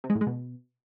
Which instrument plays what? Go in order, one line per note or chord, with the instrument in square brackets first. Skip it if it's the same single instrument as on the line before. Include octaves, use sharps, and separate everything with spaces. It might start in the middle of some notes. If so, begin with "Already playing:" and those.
[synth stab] C3
G#3
A2
G#3
B2